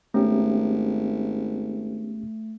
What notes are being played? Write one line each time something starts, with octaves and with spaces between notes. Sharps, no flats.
G#1 A3 B3 C#4 G4